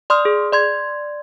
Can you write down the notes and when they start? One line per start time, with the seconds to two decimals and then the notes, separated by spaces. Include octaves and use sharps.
0.10 D5 C6 D#6 F6
0.25 G#4
0.52 D5 C6 G#6